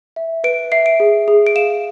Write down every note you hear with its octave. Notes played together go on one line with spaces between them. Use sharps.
E5
B4 D7
E5 C7
D7
G#4
G#4
D7
F5 E7